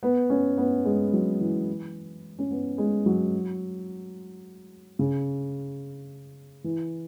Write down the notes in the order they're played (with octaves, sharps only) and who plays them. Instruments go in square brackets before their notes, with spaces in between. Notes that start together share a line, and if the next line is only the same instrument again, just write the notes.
[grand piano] B3
C#4
B3
G#3
F#3
E3
C#4
B3
G#3
F#3
C#3
E3